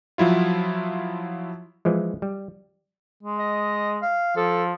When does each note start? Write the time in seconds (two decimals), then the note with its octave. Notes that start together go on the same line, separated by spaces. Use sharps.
0.18 F3 F#3 E4 F4
1.85 E3 F3 G#3
2.22 G3
3.23 G#3
3.39 D#5
4.02 F5
4.36 F3 A4